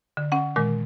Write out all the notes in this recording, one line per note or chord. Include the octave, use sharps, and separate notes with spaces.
D3
C#4 F#5
A#2 D#3 G#3 A#4